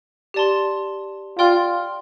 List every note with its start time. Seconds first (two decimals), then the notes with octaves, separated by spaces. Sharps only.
0.34 G4 D5 A5 C6
1.39 F4 D5 G5 C6 F6